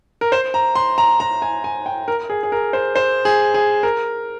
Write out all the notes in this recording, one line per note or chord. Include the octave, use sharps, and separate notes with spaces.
A#4
C5
A#5
C6
A#5
A#5
G#5
G#5
G5
A#4
G#4
G#4
A#4
C5
C5
G#4
G#4
A#4